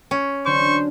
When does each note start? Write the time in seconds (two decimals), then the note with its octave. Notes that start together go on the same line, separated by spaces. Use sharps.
0.11 C#4
0.46 D3 F#3 D4 C5 C#6